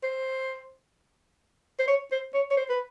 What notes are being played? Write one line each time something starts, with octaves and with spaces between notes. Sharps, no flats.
C5
C5
C#5
C5
C#5
C#5
C5
B4